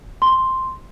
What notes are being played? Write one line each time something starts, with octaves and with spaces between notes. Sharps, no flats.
C6